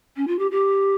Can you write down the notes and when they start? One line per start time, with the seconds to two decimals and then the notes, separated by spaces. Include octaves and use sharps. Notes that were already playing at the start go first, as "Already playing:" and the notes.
0.16 C#4
0.27 F4
0.39 G4
0.51 G4